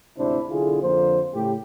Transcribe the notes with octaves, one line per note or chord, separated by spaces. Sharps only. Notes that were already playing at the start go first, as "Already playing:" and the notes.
D2 G#2 C3 D4 E4 C5
B1 D3 E4 F4 G#4
F2 D3 F3 A#3 C5
A2 C#3 G4